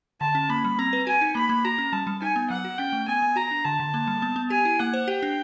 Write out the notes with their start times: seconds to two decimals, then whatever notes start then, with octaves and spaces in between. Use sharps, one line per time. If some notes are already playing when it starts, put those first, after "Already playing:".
0.21 D3 A5
0.35 C#4
0.49 A#3 B5
0.64 G3
0.79 C4 A#5
0.93 B4
1.07 F#4 G#5
1.21 D#4
1.35 A#3 B5
1.49 A#3
1.64 F#4 A#5
1.78 C#4
1.92 G3 A5
2.07 G3
2.22 D#4 G#5
2.36 B3
2.50 F#3 F#5
2.64 F#4
2.78 C#4 G5
2.93 A3
3.08 B3 G#5
3.22 B3
3.36 F#4 A#5
3.51 D4
3.64 D3 A5
3.80 D3
3.94 A#3
4.07 G3
4.22 B3
4.36 B3
4.50 G4 G#5
4.65 E4
4.80 A#3 F#5
4.93 C5
5.08 G4 G5
5.23 D4